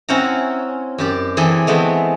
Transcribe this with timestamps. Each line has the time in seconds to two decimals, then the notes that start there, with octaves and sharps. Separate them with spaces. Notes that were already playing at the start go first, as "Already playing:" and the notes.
0.09 C4 C#4 E4 C5 F#5 A#5
0.98 F#2 G4 D5
1.37 E3 C4 G#4 A4
1.67 G#3 A3 B3 C4